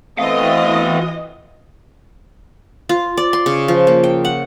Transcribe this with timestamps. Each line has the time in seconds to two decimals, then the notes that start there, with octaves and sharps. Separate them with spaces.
0.19 E3 A3 B3 C4 F#4 D#5 F5
2.89 F4
3.17 D5
3.33 C6
3.46 C#3
3.68 F3
3.87 A#3
4.04 G5
4.25 F#5